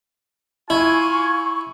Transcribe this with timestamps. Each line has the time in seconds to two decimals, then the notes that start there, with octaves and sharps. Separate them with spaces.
0.70 E4 F4 G#5 C#6